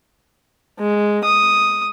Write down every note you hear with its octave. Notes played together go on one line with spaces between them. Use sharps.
G#3
D#6